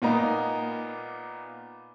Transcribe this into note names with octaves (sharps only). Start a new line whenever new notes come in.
A#2 A#3 B3 D#4 A#5